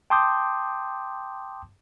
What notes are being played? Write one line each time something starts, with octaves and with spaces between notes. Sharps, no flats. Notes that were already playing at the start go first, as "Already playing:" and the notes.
G5 A5 C6 D6 D#6 G6